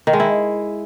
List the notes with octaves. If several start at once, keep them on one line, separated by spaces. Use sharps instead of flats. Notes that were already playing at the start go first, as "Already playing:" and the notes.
D#3
G#3
E4